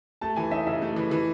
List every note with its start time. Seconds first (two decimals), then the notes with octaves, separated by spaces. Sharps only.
0.21 A3 A5
0.36 E3 G#5
0.51 D#4 E5
0.67 C#3 E5
0.82 A3
0.96 E3
1.11 E3